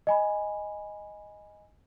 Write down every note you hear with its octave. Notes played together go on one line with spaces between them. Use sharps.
D#5 G#5 B5